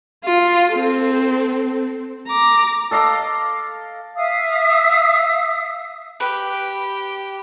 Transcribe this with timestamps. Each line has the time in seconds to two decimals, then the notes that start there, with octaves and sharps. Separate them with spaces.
0.24 F4
0.74 C4 A4
2.28 A#5 D6
2.91 A4 D#5 F5 D6
4.15 E5 F5 D#6 E6
6.20 G4 B4